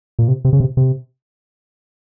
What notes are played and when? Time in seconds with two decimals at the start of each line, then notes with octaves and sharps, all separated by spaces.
0.19 A#2
0.28 C3
0.45 C3
0.53 C#3
0.60 C3
0.77 C3